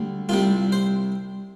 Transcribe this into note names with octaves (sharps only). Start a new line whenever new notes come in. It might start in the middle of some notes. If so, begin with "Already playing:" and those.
Already playing: D2 G3
C2 C3 G3 F4
C5